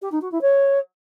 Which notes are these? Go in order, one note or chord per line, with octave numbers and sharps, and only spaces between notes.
G4
D#4
F#4
E4
C#5